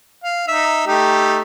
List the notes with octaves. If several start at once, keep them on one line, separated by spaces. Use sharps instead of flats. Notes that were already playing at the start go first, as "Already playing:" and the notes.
F5
D#4 E5
A3 D#4 G4